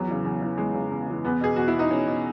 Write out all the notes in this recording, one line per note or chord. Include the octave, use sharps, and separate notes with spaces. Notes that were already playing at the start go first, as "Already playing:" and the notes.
Already playing: E2 F#3
C#3 E3
E2
C#3 E3
E2 G#3
C#3 E3
E2
C#3 E3
E2 B3
B2 G#4
E2 F#4
E4
B2 D#4
E2 C#4
B2